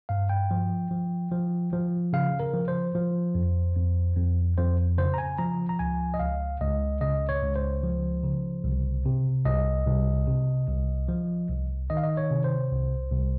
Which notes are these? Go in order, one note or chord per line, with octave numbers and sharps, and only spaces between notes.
G2 F5
G5
F3
F3
F3
F3
C#3 F5
A#4
F3
C5
F3
F2
F2
F2
F2 C5
C#3 C5
A#5
G#5
F3 A#5
A#5
C#2 G#5
D#5
C#2 F5
C#2 D#5
C#3 D#5
C#5
C#2
C5
F3
C#3
C2
C3
C2 D#5
C2
C3
C2
F3
C2
D#3 D#5
F5
D#5
C#5
C3
C5
C2
C2